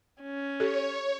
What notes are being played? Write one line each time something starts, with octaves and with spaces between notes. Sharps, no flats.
C#4
G4 A4 C#5